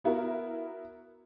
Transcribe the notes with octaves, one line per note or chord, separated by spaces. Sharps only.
B3 E4 F#4 A#4